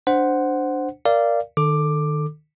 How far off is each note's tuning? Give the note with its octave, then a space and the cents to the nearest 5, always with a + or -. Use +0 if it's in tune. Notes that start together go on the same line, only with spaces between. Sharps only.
D4 +0 C5 -5 F#5 +0
A#4 +0 D5 +0 F5 -20
D#3 -35 A4 +0 D6 +10